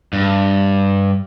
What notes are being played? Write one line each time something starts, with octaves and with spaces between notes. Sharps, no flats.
G2